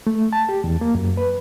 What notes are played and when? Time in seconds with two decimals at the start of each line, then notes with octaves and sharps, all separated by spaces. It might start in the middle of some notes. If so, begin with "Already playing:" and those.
0.07 A3
0.33 A5
0.49 G4
0.64 E2
0.81 A#3
0.95 F#2
1.17 B4